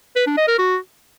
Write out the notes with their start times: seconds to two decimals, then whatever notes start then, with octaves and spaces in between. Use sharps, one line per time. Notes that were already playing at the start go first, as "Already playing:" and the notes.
0.16 B4
0.26 D4
0.37 D#5
0.48 A#4
0.58 F#4